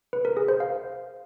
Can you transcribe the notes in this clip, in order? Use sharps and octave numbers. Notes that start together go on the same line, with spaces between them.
B4
A#4
G#4
C5
F5